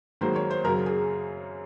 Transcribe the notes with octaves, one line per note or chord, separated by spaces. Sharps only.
G#2 D#3 F#3 A#3 C5
C#5
C5
F#2 C#3 F#3 A#4
G#4